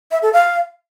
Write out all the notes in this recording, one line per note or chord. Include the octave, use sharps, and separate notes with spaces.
E5
A4
F5